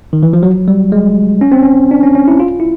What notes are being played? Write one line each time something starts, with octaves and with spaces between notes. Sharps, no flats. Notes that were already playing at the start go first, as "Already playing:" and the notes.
D#3
E3
F3
F#3
G3
G#3
C#4
C4
C#4
D4
C#4
C#4
E4
F4
E4